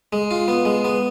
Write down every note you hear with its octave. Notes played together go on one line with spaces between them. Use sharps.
G#3
F4
B3
G#3
B3